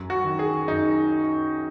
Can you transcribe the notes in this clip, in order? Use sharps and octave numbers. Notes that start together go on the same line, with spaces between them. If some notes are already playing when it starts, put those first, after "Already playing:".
Already playing: F#2
F#4
D#3
G#4
F#2 D#4